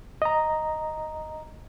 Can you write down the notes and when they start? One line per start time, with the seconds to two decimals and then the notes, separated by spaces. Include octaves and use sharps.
0.22 D#5 A#5